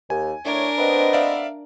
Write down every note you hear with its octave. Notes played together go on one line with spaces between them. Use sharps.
D#2 G#5
A2 D4 A#4 C#5
B3 C4 B4 C5 D#5
D5 E5 F5